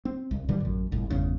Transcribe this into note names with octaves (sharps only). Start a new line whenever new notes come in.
C4
C2
A#2 D3 E3 G3
A1 F#2
G1 C2 A2
G1 E2 C#3